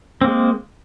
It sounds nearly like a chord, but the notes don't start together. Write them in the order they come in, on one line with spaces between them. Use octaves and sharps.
C4 A#3 G#3